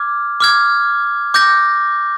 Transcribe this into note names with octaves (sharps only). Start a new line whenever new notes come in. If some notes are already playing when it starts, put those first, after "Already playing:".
Already playing: D6 F6 G#6
D6 F6 G#6
D6 G6 A#6